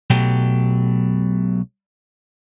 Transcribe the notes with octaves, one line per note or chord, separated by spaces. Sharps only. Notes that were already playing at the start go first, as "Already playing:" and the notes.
B1 B2 F#3 A3 G4